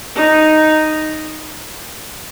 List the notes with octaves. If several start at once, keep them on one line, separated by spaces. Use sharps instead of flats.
D#4